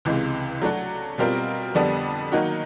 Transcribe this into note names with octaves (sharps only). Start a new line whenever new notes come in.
C#2 C3 E3 G#3
F#3 A3 D4 F#4
B2 G3 C4 F4 A#4
F2 D3 G3 B3 D4
D#3 F#3 A#3 D#4 F#4